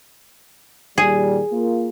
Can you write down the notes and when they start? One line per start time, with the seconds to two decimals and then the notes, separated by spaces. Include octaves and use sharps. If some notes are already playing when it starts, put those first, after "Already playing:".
0.98 A#2 D#3 G3 G#4
1.52 A#3 F4